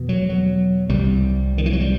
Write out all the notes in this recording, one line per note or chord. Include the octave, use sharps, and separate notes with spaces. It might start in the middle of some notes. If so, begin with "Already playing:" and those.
Already playing: E2 B2
F#3
F#3
C2 C3 G3
D#3
E3
F#3
G3